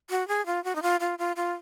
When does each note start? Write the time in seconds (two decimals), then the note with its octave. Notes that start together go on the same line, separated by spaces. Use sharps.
0.10 F#4
0.28 G#4
0.46 F4
0.64 F#4
0.76 D#4
0.82 F4
1.00 F4
1.19 F4
1.36 F4